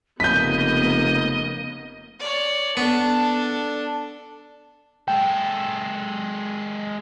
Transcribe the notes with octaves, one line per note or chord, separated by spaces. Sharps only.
F1 C#3 A#3 B3 D#5 G6 B6
C#5 D5
B3 D4 A4
G#3 A4 G5